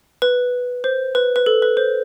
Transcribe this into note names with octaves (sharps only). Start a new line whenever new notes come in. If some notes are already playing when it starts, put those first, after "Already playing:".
B4
C5
B4
B4
A4
B4
C5